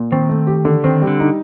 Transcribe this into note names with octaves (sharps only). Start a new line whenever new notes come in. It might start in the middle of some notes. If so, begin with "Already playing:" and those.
Already playing: A#2
D#3 C4
A3
G4
D3
D#3 C4
G3
D3
D#4